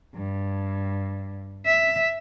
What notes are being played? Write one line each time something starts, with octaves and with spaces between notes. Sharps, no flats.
G2
E5